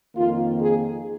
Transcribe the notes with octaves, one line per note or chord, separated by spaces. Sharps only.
F2 D#3 A#3 F4
G#4